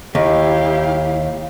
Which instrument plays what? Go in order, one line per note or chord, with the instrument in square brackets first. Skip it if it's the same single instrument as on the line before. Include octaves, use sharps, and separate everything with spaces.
[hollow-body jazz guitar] D#2 [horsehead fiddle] E4 G4 [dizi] F5